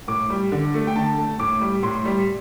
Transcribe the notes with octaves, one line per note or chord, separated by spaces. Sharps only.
A2 D6
G3
D3
A3
G5
D3 A5
A3
A2 D6
G3
A2 C6
G3